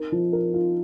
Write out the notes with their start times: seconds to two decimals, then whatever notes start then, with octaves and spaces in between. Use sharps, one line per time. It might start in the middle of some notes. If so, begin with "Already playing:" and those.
Already playing: D#4 A#4
0.12 F3
0.33 A#4
0.54 F4